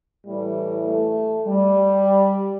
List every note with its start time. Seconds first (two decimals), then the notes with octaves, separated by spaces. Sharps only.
0.25 A2 E3 G3
0.86 A3
1.47 G3